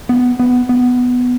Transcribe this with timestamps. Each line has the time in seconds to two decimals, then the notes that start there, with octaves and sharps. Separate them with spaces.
0.09 B3
0.39 B3
0.69 B3